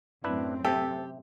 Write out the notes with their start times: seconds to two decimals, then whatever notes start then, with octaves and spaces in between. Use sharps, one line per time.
0.24 F#2 A2 C4 D4 E4 B4
0.65 C3 G4 A4 E5